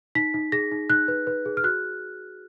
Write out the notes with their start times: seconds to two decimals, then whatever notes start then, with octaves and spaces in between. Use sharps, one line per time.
0.15 D#4 B6
0.34 D#4
0.52 G#4 A#6
0.71 D#4
0.90 D#4 F#6
1.08 B4
1.27 B4
1.46 G#4
1.57 F6
1.64 F#4 F#6